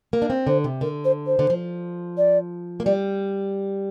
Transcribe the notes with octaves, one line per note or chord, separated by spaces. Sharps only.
A#3 A#4
D4
C4
D3 C5
C3
D3 A#4
C5
C5
D3
F3
D5
A#3
G3 D5